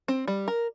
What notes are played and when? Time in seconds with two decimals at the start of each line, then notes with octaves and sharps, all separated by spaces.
0.08 C4
0.28 G3
0.48 A#4